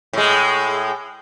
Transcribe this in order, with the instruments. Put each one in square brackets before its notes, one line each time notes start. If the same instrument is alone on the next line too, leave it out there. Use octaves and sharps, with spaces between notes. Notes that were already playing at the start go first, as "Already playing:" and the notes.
[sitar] A2 G#3